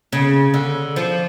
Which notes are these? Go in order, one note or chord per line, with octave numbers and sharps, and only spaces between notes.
C#3
D3
F3